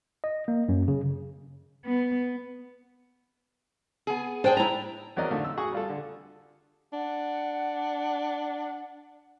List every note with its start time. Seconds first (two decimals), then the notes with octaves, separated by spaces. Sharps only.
0.24 D#5
0.48 A#3
0.69 F#2
0.88 C#3
1.86 B3
4.07 B3 G#4
4.44 D4 G#4 C5 G5
4.57 E4 A#5
5.17 E2 F#3 C4 A#4 D5 D#5
5.31 D3 A3 D#4 F4
5.45 E6
5.57 F#4 G#4 F#5 C#6
5.72 G3 F4 A4
5.90 D3
6.93 D4 F#5